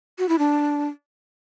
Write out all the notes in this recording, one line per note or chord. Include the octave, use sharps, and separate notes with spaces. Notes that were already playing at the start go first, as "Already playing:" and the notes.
F#4
E4
D4